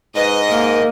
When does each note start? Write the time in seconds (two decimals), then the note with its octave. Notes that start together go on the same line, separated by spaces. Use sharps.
0.16 G#2 B4 D#5
0.50 A#3 A#4